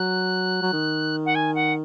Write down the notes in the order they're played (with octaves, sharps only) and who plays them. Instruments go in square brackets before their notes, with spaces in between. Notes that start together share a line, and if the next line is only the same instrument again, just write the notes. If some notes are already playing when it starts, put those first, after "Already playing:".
Already playing: [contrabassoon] F#3 [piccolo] F#6
[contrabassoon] F#3
D#3
[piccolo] F#5
G#5
F#5